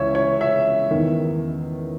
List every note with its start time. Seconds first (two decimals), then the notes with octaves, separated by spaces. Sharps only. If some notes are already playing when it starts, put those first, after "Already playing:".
Already playing: C#2 C#3 E3 C#5 E5
0.15 C#5
0.41 E5
0.91 E2 D#3